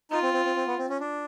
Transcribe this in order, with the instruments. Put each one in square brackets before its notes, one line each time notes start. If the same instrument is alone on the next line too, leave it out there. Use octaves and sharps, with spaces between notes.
[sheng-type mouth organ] D#4 [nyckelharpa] F4
[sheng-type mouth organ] C4
C4
C4
C4
B3
C4
C#4
D4